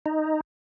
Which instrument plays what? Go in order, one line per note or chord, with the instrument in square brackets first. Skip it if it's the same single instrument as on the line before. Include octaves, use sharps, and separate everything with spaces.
[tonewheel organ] D#4